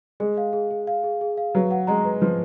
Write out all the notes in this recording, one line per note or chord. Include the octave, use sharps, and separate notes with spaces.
G#3 G#4
F5
G#4
G#4
F5
G#4
G#4
F5
F#3 B4
F#5
G#3 A#5
B4
F3 B4